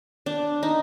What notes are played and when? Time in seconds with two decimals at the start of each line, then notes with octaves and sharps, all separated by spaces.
0.26 D4
0.63 D#4